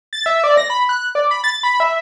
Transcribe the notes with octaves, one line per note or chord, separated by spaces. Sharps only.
A6
E5
D5
A#6
B5
F#6
D5
B5
A6
B5
E5